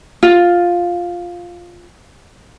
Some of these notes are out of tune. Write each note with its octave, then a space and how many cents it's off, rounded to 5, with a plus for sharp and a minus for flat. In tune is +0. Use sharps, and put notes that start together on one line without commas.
F4 +5